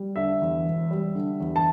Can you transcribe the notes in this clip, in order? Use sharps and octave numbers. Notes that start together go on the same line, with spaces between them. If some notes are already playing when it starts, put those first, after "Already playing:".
Already playing: G3
D3 E5
E2
E1
G3
D3
E2
A5